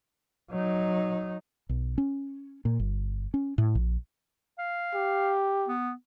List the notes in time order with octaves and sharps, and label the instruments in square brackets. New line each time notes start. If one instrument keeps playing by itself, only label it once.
[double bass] F#3 D#4
[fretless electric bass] B1
C#4
A#2
G1
C#4
A2
A#1
[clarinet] F5
[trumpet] G4
[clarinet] B3